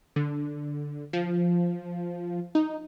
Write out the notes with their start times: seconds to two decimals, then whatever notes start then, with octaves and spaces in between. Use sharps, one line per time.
0.16 D3
1.13 F3
2.55 D#4